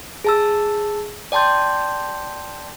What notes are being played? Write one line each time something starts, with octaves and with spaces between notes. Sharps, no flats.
G#4 A5 E6
D5 G5 A5 C6 G6